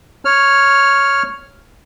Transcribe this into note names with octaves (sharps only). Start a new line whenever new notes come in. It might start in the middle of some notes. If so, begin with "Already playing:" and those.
C#5 F6